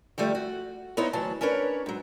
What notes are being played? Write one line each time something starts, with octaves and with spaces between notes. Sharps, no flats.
D3 F3 G3 A3
F#4
B3 D#4 E4 C5 C#5 D#5
D2 E3 F#3 A5
C#4 D4 A#4 B4 C#5
G#2 F#3